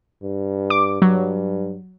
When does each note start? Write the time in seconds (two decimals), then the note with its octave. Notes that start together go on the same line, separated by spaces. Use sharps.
0.23 G2
0.70 D6
1.02 G2 F#3